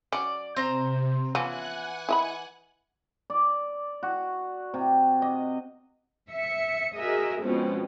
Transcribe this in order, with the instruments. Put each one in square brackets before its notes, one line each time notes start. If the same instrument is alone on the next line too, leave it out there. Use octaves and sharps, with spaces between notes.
[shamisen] F#3 C#4 [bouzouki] D5
[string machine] C3 [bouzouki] C4 C5 A#5
[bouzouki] E3 [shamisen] F3 B3 C#4 [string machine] F#5 G#5 F#6
[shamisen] E4 D#5 B5
[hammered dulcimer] D5
F#4
C3
D#5
[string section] E5 C#7
F#4 G#4 A#4 D#5 E5
B2 F3 G#3 C4 C#4